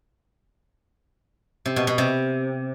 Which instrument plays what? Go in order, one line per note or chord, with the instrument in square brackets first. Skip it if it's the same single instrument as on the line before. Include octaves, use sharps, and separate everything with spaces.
[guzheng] C3
B2
B2
C3